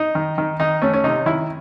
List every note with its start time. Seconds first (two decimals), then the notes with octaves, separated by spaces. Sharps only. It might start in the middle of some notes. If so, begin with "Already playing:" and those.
Already playing: D#4
0.15 D#3
0.38 D#3
0.60 D#3 D#4
0.82 A3 C#4
0.94 C#4
1.04 C3 D#4
1.26 D#3 E4